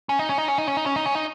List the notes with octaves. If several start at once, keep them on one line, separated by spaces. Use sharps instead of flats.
C#4
D#4
C#4
D#4
C#4
D#4
C#4
D#4
C#4
D#4
C#4
D#4